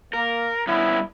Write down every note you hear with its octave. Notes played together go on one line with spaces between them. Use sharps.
A#3 A#4
G2 B3 C#4 E4